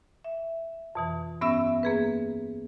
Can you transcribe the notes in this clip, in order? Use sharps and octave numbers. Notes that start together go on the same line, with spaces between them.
E5
F2 B2 E3
G2 B3 C#4 E5 E6
A#3 G#4 B4